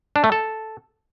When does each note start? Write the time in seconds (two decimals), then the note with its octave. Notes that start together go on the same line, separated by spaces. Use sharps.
0.16 D4
0.24 A3
0.32 A4